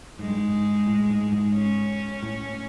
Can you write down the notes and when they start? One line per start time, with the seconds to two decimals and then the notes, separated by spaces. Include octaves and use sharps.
0.19 G#2 G#3
0.28 G2
0.37 G#2
0.87 A2
1.10 G#2
1.32 G#2
1.55 C#4
2.23 A2